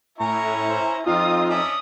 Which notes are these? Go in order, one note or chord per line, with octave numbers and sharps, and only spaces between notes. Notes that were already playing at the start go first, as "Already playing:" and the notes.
A2 C#4 E4 A#5 C#6
C5
F2 C4 D#4 F4 D#6
C#4 D4 E5 D#6